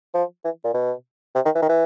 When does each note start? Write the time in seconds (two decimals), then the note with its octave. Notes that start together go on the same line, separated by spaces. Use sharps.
0.14 F3
0.44 E3
0.64 A#2
0.74 B2
1.35 C3
1.45 D#3
1.55 E3
1.62 D#3
1.69 E3